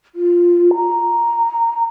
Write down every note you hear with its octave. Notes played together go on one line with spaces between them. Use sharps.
F4
A#5